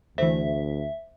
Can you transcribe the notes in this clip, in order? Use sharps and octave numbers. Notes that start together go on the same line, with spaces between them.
D2 E3 A3 C5 E5